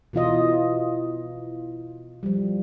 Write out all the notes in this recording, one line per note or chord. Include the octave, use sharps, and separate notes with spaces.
B2 E3 F4 D#5
F3 G3